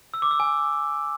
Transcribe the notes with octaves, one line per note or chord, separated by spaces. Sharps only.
E6
D6
E6
G#5